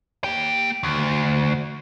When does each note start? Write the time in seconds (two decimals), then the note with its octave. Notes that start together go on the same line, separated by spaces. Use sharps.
0.24 A#3 G5
0.83 D2